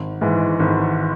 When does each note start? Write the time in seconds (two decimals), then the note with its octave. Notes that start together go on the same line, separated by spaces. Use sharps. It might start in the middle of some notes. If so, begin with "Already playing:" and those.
Already playing: G#1
0.21 G#2 E3
0.60 G#1